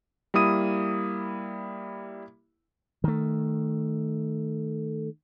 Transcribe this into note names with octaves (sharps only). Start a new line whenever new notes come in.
G3 A#3 E4 D#6 D#7
D#3 A3